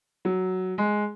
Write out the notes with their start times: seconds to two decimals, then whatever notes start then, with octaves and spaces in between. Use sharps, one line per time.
0.25 F#3
0.78 G#3